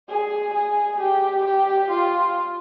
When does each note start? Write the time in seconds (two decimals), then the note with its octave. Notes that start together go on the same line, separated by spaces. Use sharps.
0.09 G#4
0.54 G#4
1.00 G4
1.45 G4
1.90 F4